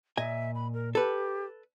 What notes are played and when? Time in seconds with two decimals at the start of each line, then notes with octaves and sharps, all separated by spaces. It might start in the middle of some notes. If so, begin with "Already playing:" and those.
0.17 A#2 D#5 E5 G#5
0.55 B5
0.74 A#4
0.95 G4 A4 B4